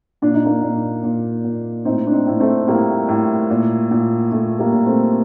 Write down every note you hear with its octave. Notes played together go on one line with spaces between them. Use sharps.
A#2 D4
D#4
A#3 D4
A#2
A#2
A#2
A2 C4 D#4
D4
C4 D#4
A2
A3 C4
A2 G3 A#3
A2
A#2
A#2
A#2 A3
G3 A#3
A#2
A3 C4